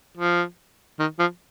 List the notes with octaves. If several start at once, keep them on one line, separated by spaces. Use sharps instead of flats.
F3
D#3
F3